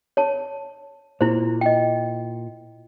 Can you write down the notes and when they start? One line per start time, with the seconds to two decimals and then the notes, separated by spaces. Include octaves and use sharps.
0.17 C#5 A5
1.21 A#2 E4 C5
1.61 D#5 G5